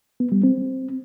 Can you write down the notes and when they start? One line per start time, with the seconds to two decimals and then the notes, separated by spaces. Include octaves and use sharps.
0.20 B3
0.32 G3
0.44 C4